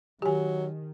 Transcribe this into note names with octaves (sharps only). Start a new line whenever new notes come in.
D#3 F#3 G4 G#5